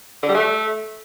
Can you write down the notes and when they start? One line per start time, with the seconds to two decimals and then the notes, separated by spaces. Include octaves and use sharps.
0.23 D3
0.29 G3
0.34 A3